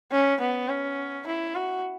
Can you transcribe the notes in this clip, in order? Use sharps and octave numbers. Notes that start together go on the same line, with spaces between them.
C#4
B3
C#4
E4
F#4